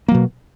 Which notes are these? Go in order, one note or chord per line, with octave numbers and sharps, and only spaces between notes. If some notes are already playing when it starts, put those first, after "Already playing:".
B2 F#3 A#3